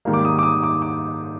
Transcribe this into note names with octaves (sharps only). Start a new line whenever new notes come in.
G#2 D#3 G3 A#3
D6
D#6
D6
D#6
D6
D6